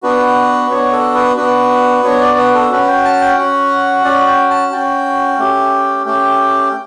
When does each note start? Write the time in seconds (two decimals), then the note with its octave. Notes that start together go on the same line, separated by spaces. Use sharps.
0.03 B3 D4 F#4 B4
0.71 B3 D4 F#4 C#5
0.92 A4
1.15 B4
1.37 B3 D4 F#4 B4
2.03 B3 D4 F#4 C#5
2.21 D5
2.38 B4
2.55 A4
2.71 C#4 F#4 B4
2.88 G5
3.05 A5
3.21 G5
3.37 C#4 F#4 F#5
4.04 C#4 F#4 D5
4.27 G5
4.50 A5
4.72 C#4 F#4 G5
5.39 A3 C#4 G4
6.06 A3 C#4 G4 G5